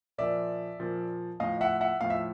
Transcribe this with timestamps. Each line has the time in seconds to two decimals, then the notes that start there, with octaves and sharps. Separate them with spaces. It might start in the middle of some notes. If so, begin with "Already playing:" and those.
0.18 A#2 F3 D5 E5
0.79 A#2 F3
1.40 A2 F3 D#5 F5
1.61 E5 F#5
1.81 E5 F#5
2.01 A2 F3 F5
2.10 E5